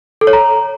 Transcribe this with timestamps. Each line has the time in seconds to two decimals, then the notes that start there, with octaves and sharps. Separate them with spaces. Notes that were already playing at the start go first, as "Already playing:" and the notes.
0.21 A4
0.27 C#5
0.33 A#5